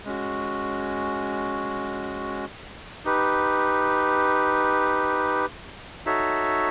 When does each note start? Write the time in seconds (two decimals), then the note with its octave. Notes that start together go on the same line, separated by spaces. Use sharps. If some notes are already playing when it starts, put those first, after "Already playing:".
0.05 G#3 C#4 F#4
3.05 D#4 G4 B4
6.06 D#4 F#4 A4 C#5 E5